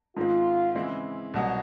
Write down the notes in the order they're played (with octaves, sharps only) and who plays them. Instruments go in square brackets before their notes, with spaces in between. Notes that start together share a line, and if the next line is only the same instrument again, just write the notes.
[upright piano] G#2 D#3 G#3 C4 [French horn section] F4
[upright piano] C#3 E3 G#3 C4 E4
C2 B2 F#3